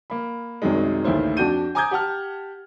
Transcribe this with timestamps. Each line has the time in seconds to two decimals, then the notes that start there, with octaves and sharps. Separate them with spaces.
0.10 A#3 B5
0.62 C2 F#2 C3 D#3 F#3 G#3
1.04 A1 D2 D#3 A#3 E4 C5
1.37 F2 D4 F#4 G6 D#7
1.75 G#5 A#5 D6 D#6 G6 G#6
1.91 G4 F#5 A5 F6